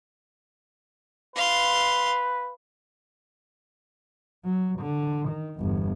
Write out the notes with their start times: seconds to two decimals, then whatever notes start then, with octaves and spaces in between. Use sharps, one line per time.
1.36 B4 F5 C6
4.44 F#3
4.79 D3
5.28 D#3
5.59 G1 E2